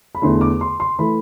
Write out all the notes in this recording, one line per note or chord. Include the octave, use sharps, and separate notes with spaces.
B5
E2 D3 A3 C6
D6
C6
C6
E3 A3 B5